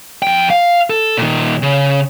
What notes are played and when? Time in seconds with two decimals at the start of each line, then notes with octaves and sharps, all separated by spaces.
0.22 F2 G5
0.50 F5
0.90 A4
1.17 A#2 D#3
1.63 C#3